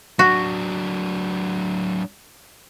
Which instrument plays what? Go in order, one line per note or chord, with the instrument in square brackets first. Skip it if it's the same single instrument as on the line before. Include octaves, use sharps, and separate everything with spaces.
[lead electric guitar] F#3 D4 [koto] F#4